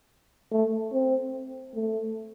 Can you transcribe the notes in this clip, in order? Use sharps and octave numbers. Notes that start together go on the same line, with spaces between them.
A3
C4
A3